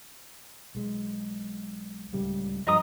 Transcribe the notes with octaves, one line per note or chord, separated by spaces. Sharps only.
B1 G#3
D1 C#2 G3
G2 F3 D#5 A#5 D#6